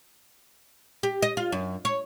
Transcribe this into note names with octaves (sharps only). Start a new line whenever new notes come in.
G4
D#5
F4
F#2
C#5